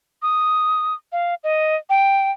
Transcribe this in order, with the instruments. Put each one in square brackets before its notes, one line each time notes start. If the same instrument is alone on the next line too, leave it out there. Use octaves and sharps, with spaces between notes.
[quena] D#6
F5
D#5
G5